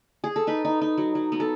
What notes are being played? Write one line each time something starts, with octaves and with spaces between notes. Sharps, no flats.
G#4
A4
D#4 B4
D#4
D#4
F#3
F#3
B3
A4